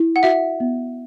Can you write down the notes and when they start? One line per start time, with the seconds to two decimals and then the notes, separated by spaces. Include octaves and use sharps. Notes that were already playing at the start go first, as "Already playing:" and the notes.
Already playing: E4
0.16 F#5
0.23 F#4 E5
0.60 B3